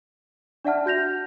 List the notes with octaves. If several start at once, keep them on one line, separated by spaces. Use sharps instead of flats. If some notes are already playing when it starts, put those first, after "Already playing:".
D4 D5 E5 F#5 A5 F6
F#4 G6 A#6 F7